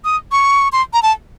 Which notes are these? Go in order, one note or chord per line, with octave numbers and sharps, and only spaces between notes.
D#6
C#6
C6
A#5
A5